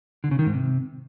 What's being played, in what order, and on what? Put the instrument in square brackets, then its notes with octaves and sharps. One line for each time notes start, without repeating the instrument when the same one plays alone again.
[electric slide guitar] D3
C#3
D#3
G#2
C3